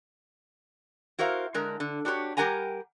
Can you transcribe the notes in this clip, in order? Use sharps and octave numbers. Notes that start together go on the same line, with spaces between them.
E4 F#4 A#4 C5 F5
D3 G#3 A#4
D3
D4 F#4 G4 A#4 C#5
G3 G4 A#4 F#5 G#5 A#5